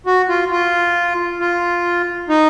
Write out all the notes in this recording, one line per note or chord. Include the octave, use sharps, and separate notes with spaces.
F#4
F4
F4
F4
D#4